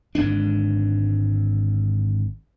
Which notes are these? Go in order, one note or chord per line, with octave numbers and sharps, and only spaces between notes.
G#1 G#2 D3 D4